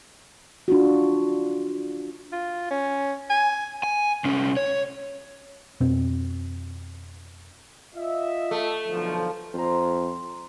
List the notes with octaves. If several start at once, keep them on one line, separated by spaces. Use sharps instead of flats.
D4 F4 F#4
F4
C#4
G#5
G#5
C2 C#4
C#5
F2 B2 C4
F4 D#5 E5
A3
B1 D3 F3
F2 C5 A#5